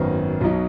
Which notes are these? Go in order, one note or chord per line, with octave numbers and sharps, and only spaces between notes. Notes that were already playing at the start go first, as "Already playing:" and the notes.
Already playing: G#1 F#2 D#3 B3
B1 B2 F#3 D#4